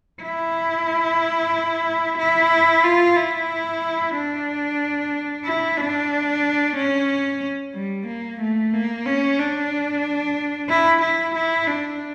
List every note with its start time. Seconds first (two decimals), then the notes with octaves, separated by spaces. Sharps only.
0.22 E4
2.18 E4
2.84 F4
3.16 E4
4.15 D4
5.45 E4
5.78 D4
6.76 C#4
7.74 G3
8.07 A#3
8.40 A3
8.73 A#3
9.06 C#4
9.39 D4
10.69 E4
11.01 E4
11.35 E4
11.67 D4